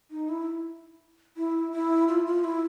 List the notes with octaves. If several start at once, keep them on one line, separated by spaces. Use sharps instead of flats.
D#4
E4
E4
E4
F4
F4
E4